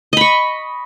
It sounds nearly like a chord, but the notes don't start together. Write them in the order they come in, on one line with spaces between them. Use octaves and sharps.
D#5 B5 C#6